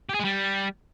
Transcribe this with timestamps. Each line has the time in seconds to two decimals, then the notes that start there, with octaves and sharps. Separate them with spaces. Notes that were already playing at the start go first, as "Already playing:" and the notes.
0.09 G4
0.14 G#4
0.20 G#3
0.25 G3